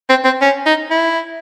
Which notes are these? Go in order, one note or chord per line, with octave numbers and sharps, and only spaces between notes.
C4
C4
C#4
D#4
E4